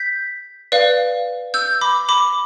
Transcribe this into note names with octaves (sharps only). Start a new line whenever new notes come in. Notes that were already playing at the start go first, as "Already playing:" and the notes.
Already playing: G6 B6
B4 D5 F5
E6 G6
B5 D6
B5 D6